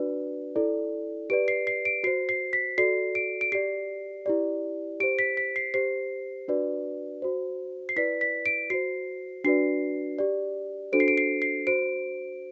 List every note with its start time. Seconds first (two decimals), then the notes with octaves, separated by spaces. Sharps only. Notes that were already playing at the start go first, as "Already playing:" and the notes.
Already playing: D4 F#4 B4 D5
0.56 E4 A4 D5
1.30 G4 B4 D5 D7
1.48 C7
1.67 C7
1.85 D7
2.03 F#4 C7
2.07 C5
2.29 C7
2.53 B6
2.78 F#4 A4 D5 C7
3.15 D7
3.41 D7
3.52 G4 D5 C7
4.26 E4 G4 D5
5.00 G4 D7
5.03 C5
5.19 B6
5.37 B6
5.56 C7
5.74 G4 C5 C7
6.48 D4 F#4 B4 D5
7.22 F#4 C5
7.89 C7
7.96 E4 B4 D5 B6
8.21 B6
8.46 D7
8.70 F#4 C5 C7
9.44 D4 F#4 B4 D5 C7
10.19 G4 D5
10.92 D4 F#4 A4 C5 D7
11.00 C7
11.08 D7
11.18 C7
11.42 C7
11.67 F#4 C5 D7